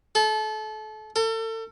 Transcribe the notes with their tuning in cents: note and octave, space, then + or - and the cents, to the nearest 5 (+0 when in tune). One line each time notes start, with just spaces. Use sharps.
A4 -30
A4 +35